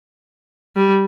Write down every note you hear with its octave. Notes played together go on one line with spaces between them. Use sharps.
G3